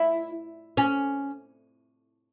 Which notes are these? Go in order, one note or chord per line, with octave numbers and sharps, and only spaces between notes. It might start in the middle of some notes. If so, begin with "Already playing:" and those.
Already playing: E4
C#4